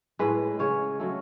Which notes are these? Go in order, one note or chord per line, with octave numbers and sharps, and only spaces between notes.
A2 G#3 B4
C#3 G#3 C#5
C#3 F#3 A3